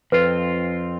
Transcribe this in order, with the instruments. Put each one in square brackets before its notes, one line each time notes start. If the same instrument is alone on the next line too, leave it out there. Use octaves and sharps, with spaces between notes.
[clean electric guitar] F2 C4 F4 [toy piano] B4